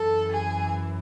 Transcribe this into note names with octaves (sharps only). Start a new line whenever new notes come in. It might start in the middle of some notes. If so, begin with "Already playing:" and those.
Already playing: F#2 E3 A4
G#4